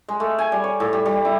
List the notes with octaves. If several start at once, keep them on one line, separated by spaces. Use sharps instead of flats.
G#3
A3
G#5
G3
C#5
A2
G3
G3
E4